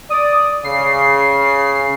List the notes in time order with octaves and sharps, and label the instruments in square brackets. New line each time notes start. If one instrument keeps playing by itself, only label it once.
[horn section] D5 [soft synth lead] D#6
[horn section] C#3 [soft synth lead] C7